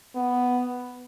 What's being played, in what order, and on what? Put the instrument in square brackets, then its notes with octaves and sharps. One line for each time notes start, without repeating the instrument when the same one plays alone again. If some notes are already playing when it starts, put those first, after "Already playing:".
[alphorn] B3